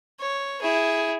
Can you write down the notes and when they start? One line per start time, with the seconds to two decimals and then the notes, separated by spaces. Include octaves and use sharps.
0.20 C#5
0.62 E4 G#4